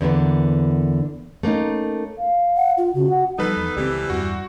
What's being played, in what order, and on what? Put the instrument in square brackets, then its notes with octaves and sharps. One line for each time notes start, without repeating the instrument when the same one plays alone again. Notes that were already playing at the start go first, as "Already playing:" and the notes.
[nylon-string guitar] E2 D3 A#3 B3
A3 A#3 C#4 D#4
[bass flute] F5
[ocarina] F#5
F4
[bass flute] C#3 [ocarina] F#4
[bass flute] F#5
[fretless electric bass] F3 G3 [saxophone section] B3 D#4 [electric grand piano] A4 B4
[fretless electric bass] E2
[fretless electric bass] C#2 G#3 C4 [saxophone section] E3 G3 G4
[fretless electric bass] E2 G2 [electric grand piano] F#4